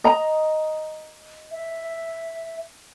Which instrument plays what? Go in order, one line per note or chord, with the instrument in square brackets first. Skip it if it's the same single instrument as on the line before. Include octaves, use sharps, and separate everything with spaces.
[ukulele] D#5 A#5
[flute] E5